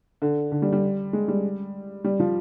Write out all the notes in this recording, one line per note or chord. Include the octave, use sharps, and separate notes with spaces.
D3
D3
G3
G3
G#3
G3
G3
F3